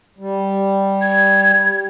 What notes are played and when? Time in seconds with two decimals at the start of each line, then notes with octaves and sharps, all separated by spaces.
0.18 G3
1.01 G#6